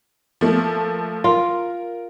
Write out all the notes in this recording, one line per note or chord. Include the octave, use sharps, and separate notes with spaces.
F3 A3 A#3
F4 A#4